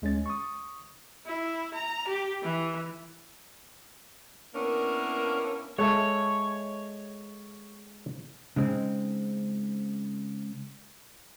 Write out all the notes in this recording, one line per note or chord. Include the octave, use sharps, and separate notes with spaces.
D2 G#3 C#4 C#5 A6
C#6 D#6
E4
A#5
G4
E3
A#3 B3 C#4 D4 E4 A#4
G#3 A4 C#5 E5
C#3 G#3 C4 D#4